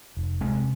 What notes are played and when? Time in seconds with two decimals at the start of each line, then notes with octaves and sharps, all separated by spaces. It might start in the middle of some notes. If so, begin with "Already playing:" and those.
0.17 F1
0.41 C3 G#3 C4